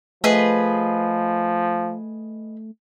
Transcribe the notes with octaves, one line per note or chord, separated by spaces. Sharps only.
F3 A3 G#4 B4 D#5